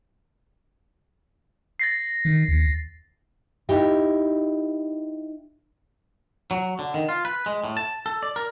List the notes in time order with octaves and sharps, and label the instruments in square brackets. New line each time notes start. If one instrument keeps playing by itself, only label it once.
[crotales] A6 A#6 C7
[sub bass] D#3
D#2
[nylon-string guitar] D#4 E4 G4
[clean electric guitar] F#3
D3
D#3
F4
B4
G#3
A2
A5
A4
D5
A#4